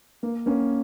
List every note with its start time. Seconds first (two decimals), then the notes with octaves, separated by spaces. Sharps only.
0.23 A#3
0.46 A#3 C#4